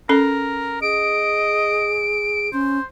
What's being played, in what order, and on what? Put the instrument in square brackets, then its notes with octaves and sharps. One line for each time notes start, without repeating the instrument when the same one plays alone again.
[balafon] C#4 A4 [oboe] A#4
[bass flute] G#4 [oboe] D#5 [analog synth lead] D7
[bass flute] C#4 [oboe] C5